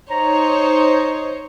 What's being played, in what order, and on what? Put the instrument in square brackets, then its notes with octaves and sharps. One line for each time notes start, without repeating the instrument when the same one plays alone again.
[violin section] D#4 C5 C#5 [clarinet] A#5